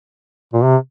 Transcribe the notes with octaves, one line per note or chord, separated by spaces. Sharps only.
A#2
C3